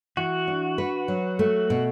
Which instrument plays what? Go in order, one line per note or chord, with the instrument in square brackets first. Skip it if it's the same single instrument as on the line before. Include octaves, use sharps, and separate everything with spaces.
[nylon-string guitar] E3 [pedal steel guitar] F#4
[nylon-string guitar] D4
B4
F#3
A3
B2